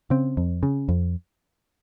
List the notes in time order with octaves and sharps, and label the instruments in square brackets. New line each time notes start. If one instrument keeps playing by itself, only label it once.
[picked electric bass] C#3 C4
F2
C#3
F2